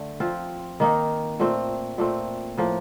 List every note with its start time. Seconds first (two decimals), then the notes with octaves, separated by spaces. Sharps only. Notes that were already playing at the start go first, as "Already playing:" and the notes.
Already playing: D3 A3
0.20 F3 C4 F4
0.80 D#3 A#3 D#4
1.40 A#2 A3 C4
1.98 A#2 A3 C4
2.57 A2 F3 A#3